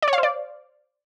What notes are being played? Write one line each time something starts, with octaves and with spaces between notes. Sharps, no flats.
D5
C#5
F5
C5
D5